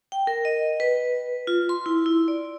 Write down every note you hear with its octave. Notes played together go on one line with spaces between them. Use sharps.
G5
A#4
D#5
B4
F4
C6
E4
E4
D5